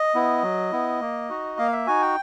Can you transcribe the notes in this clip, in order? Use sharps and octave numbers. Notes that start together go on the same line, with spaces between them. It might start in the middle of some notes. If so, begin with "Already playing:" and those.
Already playing: D#5
B3 E4
F#3
B3 E4
A#3
D#4 F#4
A#3 F5
E5
D#4 F#4 G#5
G5